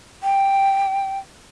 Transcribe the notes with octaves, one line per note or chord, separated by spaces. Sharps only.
G5